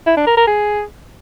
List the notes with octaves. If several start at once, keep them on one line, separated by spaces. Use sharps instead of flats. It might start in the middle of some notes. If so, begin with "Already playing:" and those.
E4
D4
A#4
A#4
G#4